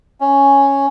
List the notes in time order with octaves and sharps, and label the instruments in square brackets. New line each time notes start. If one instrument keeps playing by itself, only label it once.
[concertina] C#4